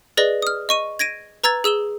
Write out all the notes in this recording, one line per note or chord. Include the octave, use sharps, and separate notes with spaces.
G#4 B4 D5 D#5 A#6 G7
D#6 F6
D#5 C#6 D#7
G#6 A#6 D7 D#7
B4 A#5 E6 G#6 A6
G#4 E6 E7 G7